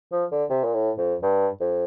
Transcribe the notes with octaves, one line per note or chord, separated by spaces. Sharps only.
F3
D3
C3
A#2
A2
F2
G2
F2